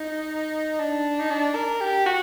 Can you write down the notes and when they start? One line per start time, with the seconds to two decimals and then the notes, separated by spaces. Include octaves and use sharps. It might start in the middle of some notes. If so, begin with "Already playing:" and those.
Already playing: D#4
0.79 D4
1.19 D#4
1.30 D4
1.55 A#4
1.81 G4
2.06 F#4